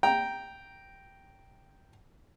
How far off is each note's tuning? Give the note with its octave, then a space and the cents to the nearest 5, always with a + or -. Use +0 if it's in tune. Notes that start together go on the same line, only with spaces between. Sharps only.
G5 -5 A#5 +0